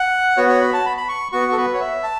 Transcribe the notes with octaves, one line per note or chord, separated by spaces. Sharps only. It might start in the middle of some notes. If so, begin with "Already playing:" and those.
Already playing: F#5
B3 F#4 C#5
C#5
B5
A5
B5
B5
C#6
B3 F#4 C#6
A4
B4
C#5
E5
A5